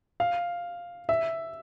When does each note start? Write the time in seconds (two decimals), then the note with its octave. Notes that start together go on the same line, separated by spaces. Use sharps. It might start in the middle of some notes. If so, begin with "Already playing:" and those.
0.20 F5
1.09 E5